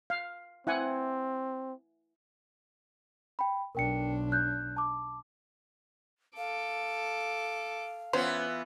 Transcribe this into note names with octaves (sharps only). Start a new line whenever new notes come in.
F5
C4 E4 F#5 G#5
G5 B5
B1 D4 A#4 G5 C#7
F#6 G6
A5 D6
A4 F5 D6
E3 B3 C#4 F4 C5